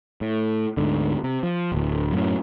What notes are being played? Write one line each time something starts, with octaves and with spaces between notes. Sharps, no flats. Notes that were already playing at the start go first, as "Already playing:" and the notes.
A2
D2 G#2 D3
C3
F3
D1 D2
F#2 A2 C#4